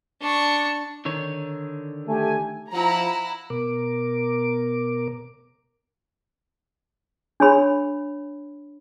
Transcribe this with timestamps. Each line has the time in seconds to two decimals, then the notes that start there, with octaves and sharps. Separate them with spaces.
0.21 D4 C#6
1.05 D3 D#3 C#5
2.08 A3 G4 G#5
2.72 F3 E4 F#5 A#5
3.50 B2 A#4 D6
7.40 D4 C#5 B5